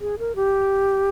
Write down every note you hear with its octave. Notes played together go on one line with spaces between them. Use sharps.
G#4
A#4
G4